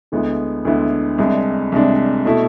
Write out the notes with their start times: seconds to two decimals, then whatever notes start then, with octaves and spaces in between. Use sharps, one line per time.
0.12 D2 D3 G#3 B3 E4
0.65 D2 D3 G#3 B3 E4
1.18 C2 C3 G#3 D4
1.72 C2 C3 G#3 D4
2.25 B2 A3 E4 A4